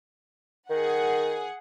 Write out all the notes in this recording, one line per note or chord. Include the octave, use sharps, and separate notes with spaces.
D#3 G#4 F#5